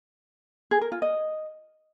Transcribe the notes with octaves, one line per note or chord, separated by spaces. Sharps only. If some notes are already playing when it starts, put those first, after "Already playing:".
G#4
A#4
F4
D#5